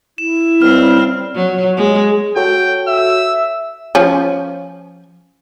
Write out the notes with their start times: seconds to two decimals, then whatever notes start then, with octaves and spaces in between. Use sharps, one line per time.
0.18 E4 E7
0.62 C#2 G3 C4 F6
1.35 F#3
1.77 G#3
2.36 F#4 A4 C#5 G5
2.88 E5 E6
3.95 F3 C#4